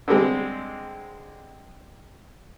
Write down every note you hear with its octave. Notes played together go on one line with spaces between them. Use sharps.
D3 G3 G#3 C4